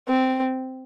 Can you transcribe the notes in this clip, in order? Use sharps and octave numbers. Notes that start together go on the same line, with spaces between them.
C4